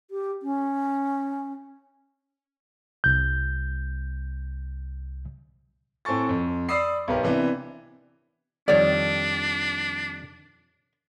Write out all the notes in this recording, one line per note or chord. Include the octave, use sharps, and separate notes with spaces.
G4
C#4
C2 G6
A2 C4 A4 G#5 C#6 A6
F2
D5 B5 D#6 E6 C7
B1 B3 G4 A#4
C3 E3 B3 D4
F2 D#3 G3 D4 C#5 D5